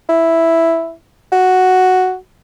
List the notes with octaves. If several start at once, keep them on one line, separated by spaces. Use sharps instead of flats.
E4
F#4